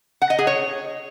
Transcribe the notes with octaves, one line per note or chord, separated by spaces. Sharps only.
F#5
D#5
G#4
C#5